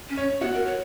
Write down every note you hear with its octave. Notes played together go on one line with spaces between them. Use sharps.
C#4
C#5
B3 F#4 F#5
A#4
C#5